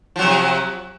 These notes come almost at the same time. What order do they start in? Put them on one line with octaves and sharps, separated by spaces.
F3 F#3 C3